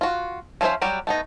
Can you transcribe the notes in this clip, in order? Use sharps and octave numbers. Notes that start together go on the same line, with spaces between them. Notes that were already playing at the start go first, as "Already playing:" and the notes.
F4 F#4
F3 B3 C#4 C5 E5
F#3 G3 F#4 G4
A3 B3 D#4